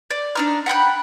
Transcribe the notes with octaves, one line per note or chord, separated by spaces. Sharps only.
D5
D4 D#4 F6
F#5 G5 B5 F#6